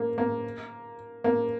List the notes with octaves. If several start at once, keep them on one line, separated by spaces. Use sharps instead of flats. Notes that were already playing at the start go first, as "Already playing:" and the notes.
Already playing: A#3
A#3
A#3